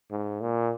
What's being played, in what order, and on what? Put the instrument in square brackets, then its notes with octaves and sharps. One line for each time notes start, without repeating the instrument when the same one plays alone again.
[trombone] G#2
A#2